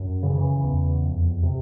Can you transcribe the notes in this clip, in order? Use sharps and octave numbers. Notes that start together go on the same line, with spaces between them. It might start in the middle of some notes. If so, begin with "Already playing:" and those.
Already playing: F#2
C#3 E3
D#3
E3
E2
F2
C3